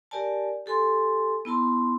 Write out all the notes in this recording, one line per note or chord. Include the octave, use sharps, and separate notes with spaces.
G4 A#4 D5 G#5 A5
G4 A4 G#5 C6
B3 E4 A5 C6